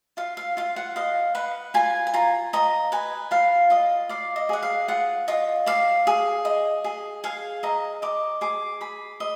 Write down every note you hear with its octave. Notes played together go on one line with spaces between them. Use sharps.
F4 F5
F5
F4 F5
F#5
D#5 F5
B4 F#5
F4 G#5
G#5
F4 A#5
D#5 A#5
B4 G#5
F4 F5
F4 D#5
D5 F5
D#5
G#4 F#5
F5
F4 F#5
F4 D#5
D5 F5
G#4
D#5
G#4
G#4 F5
D#5 A#5
D#5 D6
G#4 D6
G#4 B5
D#5